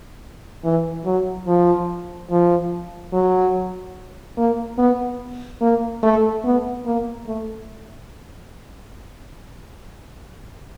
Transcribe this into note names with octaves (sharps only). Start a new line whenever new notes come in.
E3
F#3
F3
F3
F#3
A#3
B3
A#3
A3
B3
A#3
A3